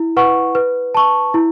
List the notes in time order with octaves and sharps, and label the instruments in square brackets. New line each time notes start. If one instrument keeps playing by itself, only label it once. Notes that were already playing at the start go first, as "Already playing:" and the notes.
Already playing: [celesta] E4
B4 F#5 C#6
B4
A5 C#6
E4